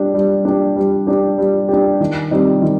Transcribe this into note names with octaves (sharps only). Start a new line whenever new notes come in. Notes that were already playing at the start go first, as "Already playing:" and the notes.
Already playing: G3 D4 G4
G3
D4 G4
G3
D4 G4
G3
D4 G4
D#3
G3 C4 D#4
D#3